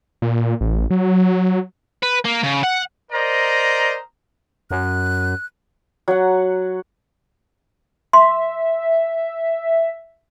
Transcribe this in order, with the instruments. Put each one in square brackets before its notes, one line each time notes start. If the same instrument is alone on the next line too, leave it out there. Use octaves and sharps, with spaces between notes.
[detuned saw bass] A#2
A1
F#3
[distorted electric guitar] B4
A#3
C#3
F#5
[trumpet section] A#4 C5 D5 D#5 A#5
[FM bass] F#2 [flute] F#6
[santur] F#3 F#5
[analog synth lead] E5 [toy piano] C6